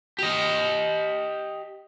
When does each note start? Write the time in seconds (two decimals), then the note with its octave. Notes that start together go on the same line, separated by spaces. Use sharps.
0.19 G4 D#5